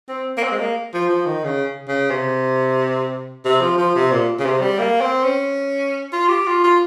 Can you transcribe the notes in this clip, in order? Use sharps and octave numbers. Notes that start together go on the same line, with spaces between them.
C4
A#3
C4
G#3
A#3
F3
F3
D#3
C#3
C#3
C3
C3
F3
F3
C3
A#2
C#3
C3
G3
A#3
C4
C#4
F4
G4
F4
F4